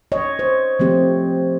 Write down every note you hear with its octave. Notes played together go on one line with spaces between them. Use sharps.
C#5 D#5
C5
F3 A3 C4 G4